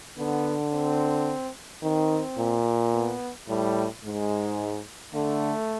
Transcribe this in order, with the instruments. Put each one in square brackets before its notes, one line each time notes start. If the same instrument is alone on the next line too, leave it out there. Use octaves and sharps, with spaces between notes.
[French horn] D3 [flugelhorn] B3
[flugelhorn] C4
[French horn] D#3 [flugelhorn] C4
[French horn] A#2
[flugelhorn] B3
[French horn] A2 [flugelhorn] G3
[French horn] G#2 [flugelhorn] G#3
[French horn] D3 [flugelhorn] A3